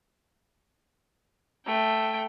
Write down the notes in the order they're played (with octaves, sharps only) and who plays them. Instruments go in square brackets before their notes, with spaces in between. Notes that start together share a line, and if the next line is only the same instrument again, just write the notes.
[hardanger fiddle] A3 G5